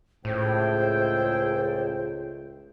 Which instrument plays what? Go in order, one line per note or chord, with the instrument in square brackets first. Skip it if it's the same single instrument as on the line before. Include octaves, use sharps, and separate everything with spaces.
[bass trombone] C#2 [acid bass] A2 [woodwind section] G#4 A4 G5 [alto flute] C5